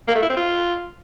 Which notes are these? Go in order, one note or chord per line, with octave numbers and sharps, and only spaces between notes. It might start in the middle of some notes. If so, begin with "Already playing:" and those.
A#3
A3
E4
C4
F4